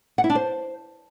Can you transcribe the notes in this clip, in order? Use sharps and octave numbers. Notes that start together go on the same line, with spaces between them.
F#5
E4
D4
C5